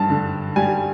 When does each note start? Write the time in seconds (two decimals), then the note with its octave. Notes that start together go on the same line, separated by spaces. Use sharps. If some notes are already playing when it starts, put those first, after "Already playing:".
Already playing: G2 A5
0.10 D3
0.56 G3 G#5